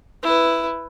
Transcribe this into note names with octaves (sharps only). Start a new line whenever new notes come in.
E4 B4